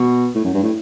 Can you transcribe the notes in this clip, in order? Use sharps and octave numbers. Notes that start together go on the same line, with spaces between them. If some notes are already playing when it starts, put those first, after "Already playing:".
Already playing: B2
A2
F#2
G2
A2